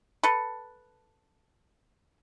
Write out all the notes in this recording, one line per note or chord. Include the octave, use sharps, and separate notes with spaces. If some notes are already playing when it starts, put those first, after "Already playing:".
A4 B4